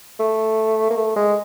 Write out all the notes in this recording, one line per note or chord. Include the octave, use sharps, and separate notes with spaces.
A3
A#3
A3
G#3